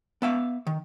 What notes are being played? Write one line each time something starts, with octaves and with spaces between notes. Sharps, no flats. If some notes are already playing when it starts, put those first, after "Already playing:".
B3 E5 F5
D#3